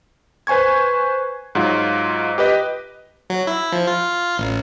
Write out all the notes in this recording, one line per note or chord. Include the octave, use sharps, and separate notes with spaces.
B4 C5 G#5 C#6 G#6
G#2 F#3 F4
G4 B4 D#5
F#3
E4
F3
F4
A1